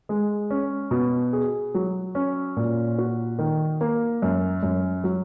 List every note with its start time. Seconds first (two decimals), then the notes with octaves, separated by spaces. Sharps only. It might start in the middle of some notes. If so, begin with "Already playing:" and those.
0.09 G#3
0.50 C#4
0.91 B2
1.33 G#4
1.74 F#3
2.15 C#4
2.57 A#2
2.98 F#4
3.39 D#3
3.81 A#3
4.22 F#2
4.63 F#2
5.04 F#3